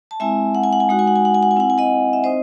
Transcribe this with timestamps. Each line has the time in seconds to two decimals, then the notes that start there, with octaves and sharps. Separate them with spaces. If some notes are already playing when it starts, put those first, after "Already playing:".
0.11 A5
0.20 G#3 C4 E4 E5 G#5
0.55 F#5
0.64 G#5
0.73 F#5
0.80 G#5
0.89 G#3 D#4 F#4 F#5
0.99 G#5
1.07 F#5
1.16 G#5
1.25 F#5
1.34 G#5
1.43 F#5
1.51 G#5
1.57 C4 E4 F#5
1.70 G#5
1.78 D#5 F#5
2.13 E5
2.24 C4 D#4 C5 D#5